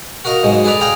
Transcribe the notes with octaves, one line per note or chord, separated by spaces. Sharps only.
F#4 A#4 D#5 F5 A#5
G#2 B2 F#3 G#3
G#4 A4 B4 D5 A#5
G#4 D5 F5 G5 A#5